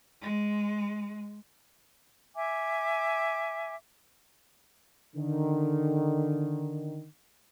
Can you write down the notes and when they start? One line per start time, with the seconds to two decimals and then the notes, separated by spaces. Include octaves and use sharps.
0.22 G#3
2.35 E5 G#5 D6
5.16 D3 D#3